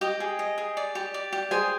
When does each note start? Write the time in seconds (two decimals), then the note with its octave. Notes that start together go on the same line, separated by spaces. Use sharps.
0.01 G4 D#5 G5
0.20 G#4
0.39 D#5
0.58 G#4
0.77 D5
0.95 G4
1.14 D5
1.32 G4
1.51 G#4 C5 G#5